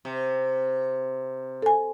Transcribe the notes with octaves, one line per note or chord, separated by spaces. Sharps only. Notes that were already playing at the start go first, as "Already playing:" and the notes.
C3
A4 G#5